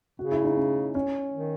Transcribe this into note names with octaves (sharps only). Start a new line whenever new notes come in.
C#3 F#4
E4
D#4
C#4
C#4
D#3